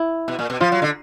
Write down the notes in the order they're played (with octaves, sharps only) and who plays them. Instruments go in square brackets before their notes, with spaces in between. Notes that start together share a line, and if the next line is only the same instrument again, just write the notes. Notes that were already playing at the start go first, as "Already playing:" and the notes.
Already playing: [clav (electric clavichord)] E4
[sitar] B2
A#2
B2
[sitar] F3 [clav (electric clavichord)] F4
[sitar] F#3
D3